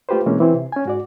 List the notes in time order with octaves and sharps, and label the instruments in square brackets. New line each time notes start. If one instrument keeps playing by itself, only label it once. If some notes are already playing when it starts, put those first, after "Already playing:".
[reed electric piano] A3 F4 G4 B4 C5
B2 E3 G#3 A#3 C4 C#4
E3 C4 E4
C3
C#4 G#5
G#2 F#4 D5